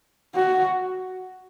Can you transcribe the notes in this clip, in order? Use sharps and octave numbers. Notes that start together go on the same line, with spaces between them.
F#4